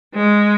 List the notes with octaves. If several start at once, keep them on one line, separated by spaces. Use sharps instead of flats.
G#3